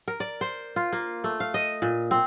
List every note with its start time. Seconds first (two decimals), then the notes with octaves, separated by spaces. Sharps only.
0.08 A#4
0.20 D5
0.41 C5
0.76 F4
0.93 A#3
1.24 A3
1.40 F5
1.54 D#5
1.82 A#2
2.11 C4